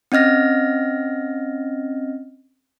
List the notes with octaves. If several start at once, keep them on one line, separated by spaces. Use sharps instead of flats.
C4 C#4 D#5 F6 A#6